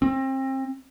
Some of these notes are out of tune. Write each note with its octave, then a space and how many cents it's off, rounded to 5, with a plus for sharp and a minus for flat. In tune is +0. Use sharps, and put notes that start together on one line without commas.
C4 +30